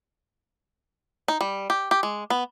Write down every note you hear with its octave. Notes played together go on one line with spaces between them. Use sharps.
D#4
G3
G4
G4
G#3
B3